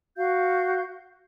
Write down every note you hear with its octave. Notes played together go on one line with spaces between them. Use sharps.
F#4 F5 G6